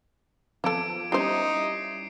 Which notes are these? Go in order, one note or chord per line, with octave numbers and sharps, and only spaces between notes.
F3 B3 C4 F4 A4 D6 G#6 D7
G3 C#4 D#4 E4 G4 C5 C7